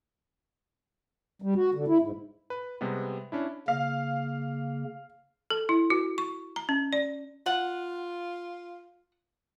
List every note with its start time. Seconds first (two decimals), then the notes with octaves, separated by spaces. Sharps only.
1.42 G3
1.55 F#4
1.74 D3
1.88 E4
2.01 G#2
2.50 B4
2.81 C3 G3 G#3 B3
3.32 C#4 D4 E4
3.68 C#3 A#3 F5
5.50 A4
5.69 E4
5.90 F#4
6.18 C#6
6.56 A#5
6.69 C#4
6.93 D5
7.46 F4 F#5